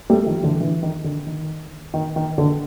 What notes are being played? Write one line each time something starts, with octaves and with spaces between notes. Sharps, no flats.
G3 A3
D#3 F3
D3 E3
D3 E3
D#3
D3
D#3
D#3
D#3
D3